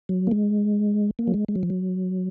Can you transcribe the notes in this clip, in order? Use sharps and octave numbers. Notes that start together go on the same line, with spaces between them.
F#3
A#3
G#3
A#3
F#3
G#3
G#3
F#3
F3
F#3